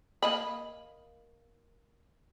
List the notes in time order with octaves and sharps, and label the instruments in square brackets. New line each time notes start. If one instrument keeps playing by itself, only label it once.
[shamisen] A#3 D#5 B5